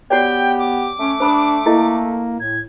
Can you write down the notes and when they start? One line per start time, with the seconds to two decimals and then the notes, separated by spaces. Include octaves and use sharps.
0.10 B3 F#4 G4 C#5 D5 G5
0.59 D6
0.99 A3 C#4
1.20 D4 C5 B5 D#6
1.66 A#3 E4 A4 D#5
2.40 A2 G#6